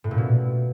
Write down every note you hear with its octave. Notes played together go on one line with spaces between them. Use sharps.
A2
A#2
B2